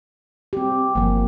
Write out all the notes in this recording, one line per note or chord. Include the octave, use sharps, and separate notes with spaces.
C4 G4
G1 F3 A#3